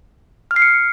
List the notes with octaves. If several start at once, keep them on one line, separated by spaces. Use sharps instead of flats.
F6
C7
C#7